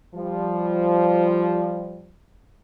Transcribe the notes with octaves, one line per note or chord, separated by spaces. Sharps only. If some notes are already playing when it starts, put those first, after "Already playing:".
F3 G3